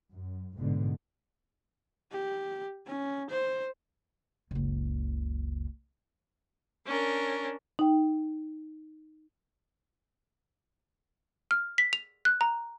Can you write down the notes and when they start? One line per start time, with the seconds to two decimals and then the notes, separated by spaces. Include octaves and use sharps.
0.11 F#2
0.55 A1 G#2 B2 D3
2.12 G4
2.87 C#4
3.30 C5
4.51 F#1 C#2
6.87 C#4 D4 A#4
7.79 D#4 G5
11.51 F6
11.78 B6
11.93 F7
12.25 F#6
12.41 A#5